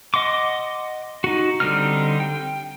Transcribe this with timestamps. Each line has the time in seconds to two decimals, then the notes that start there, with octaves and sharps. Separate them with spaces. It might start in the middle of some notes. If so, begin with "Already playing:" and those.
0.14 D#5 F#5 C6 D6
1.24 D#4 F#4
1.60 D3 G3 C4 D#4 F6
2.20 G5